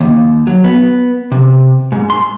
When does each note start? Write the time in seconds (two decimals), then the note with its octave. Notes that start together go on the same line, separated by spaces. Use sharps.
0.01 D#2
0.47 F#3
0.64 B3
1.32 C3
1.92 G#2
2.10 C6